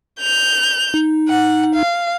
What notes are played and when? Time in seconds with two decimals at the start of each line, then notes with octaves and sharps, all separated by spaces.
0.20 G6 F7
0.94 D#4
1.29 F#5
1.75 F5